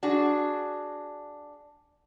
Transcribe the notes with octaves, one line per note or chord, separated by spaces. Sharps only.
D4 F#4 G#4